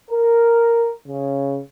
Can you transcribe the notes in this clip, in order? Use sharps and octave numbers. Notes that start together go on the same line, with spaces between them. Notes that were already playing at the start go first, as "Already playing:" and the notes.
A#4
C#3